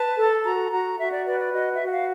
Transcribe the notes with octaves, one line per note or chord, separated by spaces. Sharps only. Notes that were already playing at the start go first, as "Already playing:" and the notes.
Already playing: B4 A5
A4
F#4 A#5
F#4 A#5
F#4 E5
D5
B4 D5
D5
F#4 D#5
E5
F#4 F#5
F5